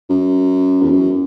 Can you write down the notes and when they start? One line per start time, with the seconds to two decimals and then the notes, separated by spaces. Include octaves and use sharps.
0.09 F#2
0.82 E2
0.91 F#2